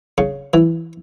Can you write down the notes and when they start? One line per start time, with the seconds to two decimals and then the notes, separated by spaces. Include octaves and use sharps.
0.18 C#3
0.54 E3